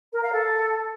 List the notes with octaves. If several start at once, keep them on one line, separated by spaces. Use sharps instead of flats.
A#4
F5
A4